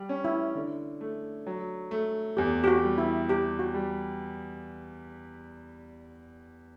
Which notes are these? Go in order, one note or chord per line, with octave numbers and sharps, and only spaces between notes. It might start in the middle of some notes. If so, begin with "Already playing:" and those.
Already playing: G3
C#4
E4
D3
A3
F#3
A3
E2 G4
G4
F#4
G3
E4
G3 G4
F#4
G3